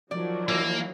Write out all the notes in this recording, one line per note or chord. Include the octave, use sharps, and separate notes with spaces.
D#3 F3 F#3 D5
E3 A#3